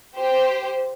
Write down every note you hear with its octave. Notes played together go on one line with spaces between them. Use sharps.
G4 C5